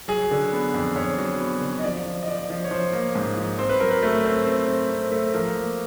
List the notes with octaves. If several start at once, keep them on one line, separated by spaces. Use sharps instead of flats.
F#3 G#4
D3
B3
F2
F2 C#5
F#3
B3
D3
D#5
F3 D5
F3
D#5
F3 D5
F3
C#5
F3 C5
A#3
G#2
F3
C4 C5
B4
F#3 A#4
B4
A3
C4
C4
C4
C4
A3
F3 A#4
A#3